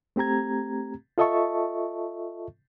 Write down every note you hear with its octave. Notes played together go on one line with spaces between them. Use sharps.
A3 C4 G4 A#5 G#6
F4 A4 D#5 E5 A5 C#6